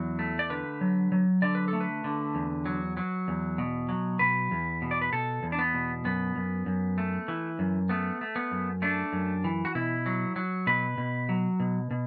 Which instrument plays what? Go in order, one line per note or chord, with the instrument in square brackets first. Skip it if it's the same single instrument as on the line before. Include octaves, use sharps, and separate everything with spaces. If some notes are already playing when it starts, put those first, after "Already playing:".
Already playing: [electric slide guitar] E2 F#3
A3
D5
D3 B4
F#3
F#3
D3 D5
B4
A3 A4
B4
D3
E2
F#3
F#3
E2
B2
F#3
B2 B4
E2
B2
D5
B4
B2 A4
E2
D4
B3
B2
F#2 B3
F#2
F#2
A3
E3
F#2
A3 B3
A3
B3
F#2
A3 D4
F#2
E3
F#4
B2 E4
F#3
F#3
B2 B4
B2
F#3
B2
B2